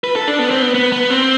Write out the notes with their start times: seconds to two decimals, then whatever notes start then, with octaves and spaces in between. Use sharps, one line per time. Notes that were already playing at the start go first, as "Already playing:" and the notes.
0.04 B4
0.16 A4
0.28 D4
0.39 B3
0.51 C4
0.62 B3
0.75 B3
0.92 B3
1.10 C4